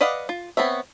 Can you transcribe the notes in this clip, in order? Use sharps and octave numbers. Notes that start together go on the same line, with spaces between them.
B4 D5 D#5 F5 F#5
F4
B3 C4 C#5 E5